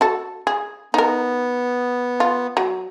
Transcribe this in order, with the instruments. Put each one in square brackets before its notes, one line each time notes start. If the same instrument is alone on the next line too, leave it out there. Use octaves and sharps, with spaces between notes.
[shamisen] F#4 A4
G#4
[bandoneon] B3 [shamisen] D#4 A#4
[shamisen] F4
F#3